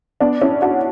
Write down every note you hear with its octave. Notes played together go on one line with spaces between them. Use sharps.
B3 D4
C#4 E4
D4 F#4